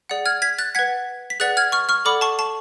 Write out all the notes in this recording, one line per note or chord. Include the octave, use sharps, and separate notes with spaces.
G#4 D5 F#5
F6 G#6
G#6 B6
F#6 A6
B4 F#5 G#6 B6
B6
G#4 B4 D5 F#5 F#6 A6
F6 G#6
C#6 F6
C#6 F6
A4 D5 F#5 B5 D6
A5 C#6
A5 C#6